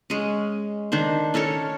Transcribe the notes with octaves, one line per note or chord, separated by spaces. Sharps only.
G#3 C#4
D#3 D4 C5
C#4 A4 A#4 C#5